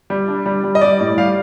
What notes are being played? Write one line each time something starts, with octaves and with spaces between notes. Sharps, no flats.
G3
D4
G3
G3
D#5
G3 D5
A2 D5
G3 F5